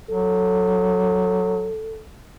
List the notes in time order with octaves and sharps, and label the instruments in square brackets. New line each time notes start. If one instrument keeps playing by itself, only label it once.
[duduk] F#3 [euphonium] A4